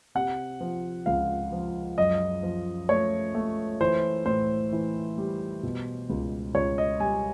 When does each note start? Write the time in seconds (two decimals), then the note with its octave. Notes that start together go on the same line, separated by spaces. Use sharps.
0.15 C3 F#5
0.60 F3
1.06 C#2 F5
1.52 F3
1.98 F#2 D#5
2.43 F3
2.89 A3 C#5
3.35 A3
3.81 E3 C5
4.26 A2 C5
4.73 E3
5.18 G3
5.63 B2
6.10 C#2
6.55 C#2 C#5
6.78 D#5
7.00 G3 G#5